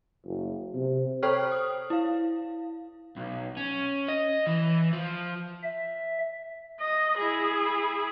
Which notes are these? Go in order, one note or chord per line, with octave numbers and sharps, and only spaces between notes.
F#1
C3
A4 C5 C#5 G5 C#6 F6
D#6
E4 F5
B1
C#4
D#5
E3
F3
E5
D#5
E4 G#4